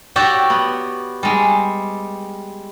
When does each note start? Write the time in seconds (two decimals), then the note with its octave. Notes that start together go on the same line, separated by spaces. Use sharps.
0.16 F#4 G4 C#5 D5 E5 G5
0.50 B3
1.23 G3 G#3